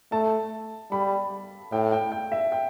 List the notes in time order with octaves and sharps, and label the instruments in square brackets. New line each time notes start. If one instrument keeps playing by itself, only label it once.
[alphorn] A3 [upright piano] A5
[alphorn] G3 [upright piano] B5
[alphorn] A2 [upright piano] G5
[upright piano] G5
G5
E5
G5